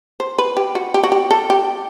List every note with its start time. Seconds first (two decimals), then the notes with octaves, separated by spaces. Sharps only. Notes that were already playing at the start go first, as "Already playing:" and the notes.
0.20 C5
0.38 B4
0.57 G4
0.75 F#4
0.94 G4
1.03 F#4
1.12 G4
1.31 A4
1.50 G4